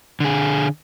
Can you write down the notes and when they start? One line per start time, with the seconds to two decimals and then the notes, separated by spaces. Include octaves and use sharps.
0.20 D3 G#4